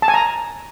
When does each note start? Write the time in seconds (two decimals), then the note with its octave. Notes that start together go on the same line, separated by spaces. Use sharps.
0.02 A5
0.08 G#5
0.14 A#5